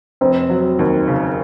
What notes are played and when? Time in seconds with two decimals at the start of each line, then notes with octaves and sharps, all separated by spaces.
0.21 F1 C4
0.50 F#3
0.79 D#2
1.08 C#3